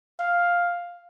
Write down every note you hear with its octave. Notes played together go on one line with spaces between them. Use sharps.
F5